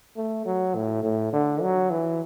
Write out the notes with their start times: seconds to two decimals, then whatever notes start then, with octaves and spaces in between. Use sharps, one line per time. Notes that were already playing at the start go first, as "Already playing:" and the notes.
0.17 A3
0.45 F#3
0.75 A2
1.03 A2
1.33 D3
1.62 F#3
1.90 E3